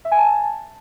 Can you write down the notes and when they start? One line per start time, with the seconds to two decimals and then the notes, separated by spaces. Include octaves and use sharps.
0.05 E5
0.11 G#5
0.18 A5